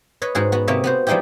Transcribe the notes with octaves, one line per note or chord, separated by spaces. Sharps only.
B4 C#5 D#5
G#2 F#4 G#4
B3 F#4
C3 A#3 C#5 D#5 E5
B3 F#4 C5
F3 G3 G#3 D#4 E4 G4